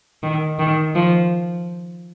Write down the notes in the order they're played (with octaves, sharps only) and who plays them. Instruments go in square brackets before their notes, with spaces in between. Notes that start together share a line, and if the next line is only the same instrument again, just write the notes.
[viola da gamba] D#3
D#3
F3